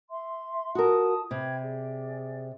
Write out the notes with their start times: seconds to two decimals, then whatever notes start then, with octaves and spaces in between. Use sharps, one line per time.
0.10 E5 C6
0.75 F4 F#4 A#4 A5 D#6
1.31 C3 G5 B5 G#6
1.60 G#4 D5